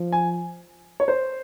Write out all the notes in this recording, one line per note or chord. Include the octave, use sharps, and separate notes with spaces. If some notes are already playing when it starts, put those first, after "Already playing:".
Already playing: F3
G#5
C#5
C5